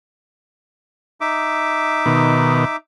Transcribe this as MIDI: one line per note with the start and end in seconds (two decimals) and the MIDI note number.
1.21 2.76 63
1.21 2.76 76
1.21 2.76 86
2.06 2.65 47
2.06 2.65 51